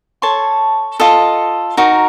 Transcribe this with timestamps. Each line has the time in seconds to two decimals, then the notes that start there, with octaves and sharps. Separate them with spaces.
0.22 A4 C#5 A5 C6
1.00 F4 A4 D#5
1.77 D#4 F#4 A#4